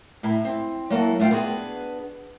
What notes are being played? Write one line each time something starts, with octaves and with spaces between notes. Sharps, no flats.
A2 E4 A#5
C4
F#3 A#3 E4 F#4 A4
A3 D4 F4 F#5 G5
B3 D4 F#4 G#4